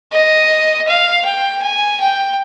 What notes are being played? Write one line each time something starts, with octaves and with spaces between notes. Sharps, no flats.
D#5
F5
G5
G#5
G5